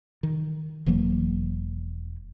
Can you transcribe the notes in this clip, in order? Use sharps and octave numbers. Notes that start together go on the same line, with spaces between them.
D#3
E1 E3 F#3 A#3